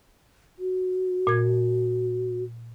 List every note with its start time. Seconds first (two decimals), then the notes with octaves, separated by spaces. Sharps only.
0.59 F#4
1.27 A#2 G#6